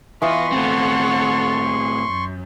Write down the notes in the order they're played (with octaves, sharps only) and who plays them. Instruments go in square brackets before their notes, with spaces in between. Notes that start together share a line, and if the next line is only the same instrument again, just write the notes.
[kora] E3 B3 F4 [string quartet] B4 D#5 F5 [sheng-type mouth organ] C6 C#6
[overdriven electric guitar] A2 C4 [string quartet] A4 C#5 F#5
[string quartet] G#4
F#2